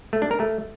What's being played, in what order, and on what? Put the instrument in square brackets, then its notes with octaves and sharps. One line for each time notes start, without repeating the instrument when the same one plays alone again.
[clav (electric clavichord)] A3
D4
A#4
A3